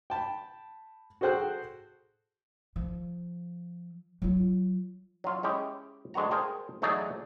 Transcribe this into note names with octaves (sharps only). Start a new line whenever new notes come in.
G5 A5 B5
F#4 G#4 A4 C5 G5 F#6
F3
F#3 F4
F#3 F4
G#3 C#4 E4 G4 G#4
D2 G#3 B3 F#4 A#5
G#4 A#4 C5 F5 G5 A5
E2 F#3 A3 D#4 G#4 D5